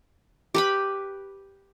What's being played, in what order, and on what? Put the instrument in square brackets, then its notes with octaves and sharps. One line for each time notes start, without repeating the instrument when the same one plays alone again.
[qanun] G4 B4 B5